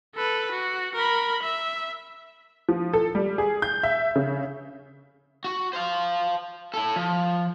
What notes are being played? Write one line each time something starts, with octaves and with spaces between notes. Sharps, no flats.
A4 B4
F#4
A#4 B5
E5
F3
A4
G3
G#4
G6
E5
C#3
F#4
C5 F5
E4 A4
F3